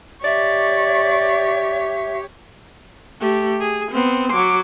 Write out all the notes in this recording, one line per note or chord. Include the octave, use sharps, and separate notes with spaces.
G4 C#5 D5 E5
A3 G4
G#4
B3 C4
F#3 D6